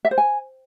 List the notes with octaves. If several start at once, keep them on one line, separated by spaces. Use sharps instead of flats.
E5
C5
G#5